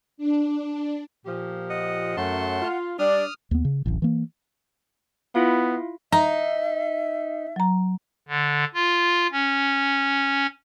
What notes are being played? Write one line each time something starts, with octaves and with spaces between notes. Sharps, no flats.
D4
A#2 F3 G4
D#5 F#5
F#2 A3 F#5 A5 C6
F4
G3 D4 D5 D#6 F6
D#2 B3
C#3
D1 A1
E3 A#3
B3 E4 F4 F5
D#4 E5 A#5
F#3 A#5
D3
F4
C#4